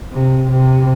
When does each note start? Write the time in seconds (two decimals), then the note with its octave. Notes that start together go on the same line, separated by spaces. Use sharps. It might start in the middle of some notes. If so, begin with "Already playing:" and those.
0.13 C3
0.51 C3